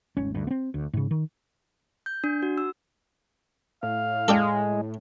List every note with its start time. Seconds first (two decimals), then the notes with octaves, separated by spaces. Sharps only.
0.17 D#1 G#1 C#4
0.35 D2 G2
0.47 B3 C4
0.74 D2
0.94 G#2 C#3
1.11 D#3
2.06 G6
2.24 D4
2.42 F#4
2.58 E6
3.83 A2 F5
4.28 G#3 A4 D5 G5